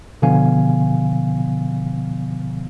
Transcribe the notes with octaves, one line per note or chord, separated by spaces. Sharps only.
B2 D3 F3 B3 F5 G#5